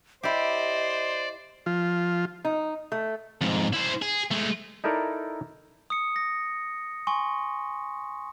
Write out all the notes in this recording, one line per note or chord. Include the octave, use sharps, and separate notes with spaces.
E4 G4 C5 D5 D#5
F3 F4
D#4
A3
F2 G#2
E4 C5
G#4
G#3 A3
D#4 E4 A4 A#4 D5
D#6 C#7
A#6
G#5 C6 C#6